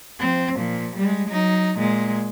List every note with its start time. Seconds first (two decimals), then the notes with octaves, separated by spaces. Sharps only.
0.19 F3 C4
0.55 A#2 F3
0.97 G3 G#3
1.28 F#3 D#4
1.79 A#2 G#3